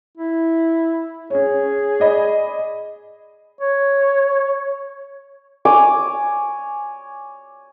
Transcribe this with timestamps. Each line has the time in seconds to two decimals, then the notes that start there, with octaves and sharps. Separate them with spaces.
0.18 E4
1.30 C#4 G#4 C#5
2.00 D5 D#5 B5
3.61 C#5
5.65 C#5 G#5 D6